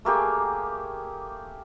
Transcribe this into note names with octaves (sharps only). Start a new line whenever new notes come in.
A3 A#3 G4 G#4